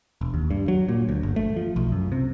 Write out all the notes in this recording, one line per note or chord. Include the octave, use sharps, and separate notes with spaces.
E1
D#2
G2
F#3
A#2
D2
G1
A3
F3
B1
F#2
C3